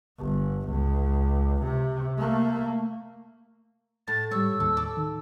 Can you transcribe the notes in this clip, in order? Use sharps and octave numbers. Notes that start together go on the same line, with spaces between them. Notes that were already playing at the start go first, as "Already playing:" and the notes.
G1
C#2
C3
A3 A#3
A2 A6
G#2 G3 C#5 E6
D#2 A4
A4 D5
D#3